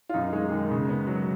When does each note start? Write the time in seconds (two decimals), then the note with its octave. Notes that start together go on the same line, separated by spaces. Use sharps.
0.09 F4
0.14 F#2 D#4
0.33 G#3
0.51 D#3
0.71 C#3
0.89 B3
1.07 F#3